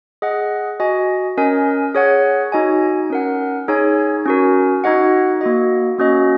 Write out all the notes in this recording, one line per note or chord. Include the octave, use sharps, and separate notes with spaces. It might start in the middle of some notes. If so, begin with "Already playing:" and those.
G#4 D#5 F#5
F#4 D#5 G#5
C#4 A#4 D#5 G#5
G#4 C#5 F#5
D#4 F#4 D#5 G#5
C#4 A#4 F#5
D#4 G#4 C#5 G#5
C#4 F#4 A#4
D#4 F#4 D#5 F#5
A#3 F#4 D#5
A#3 C#4 F#4 D#5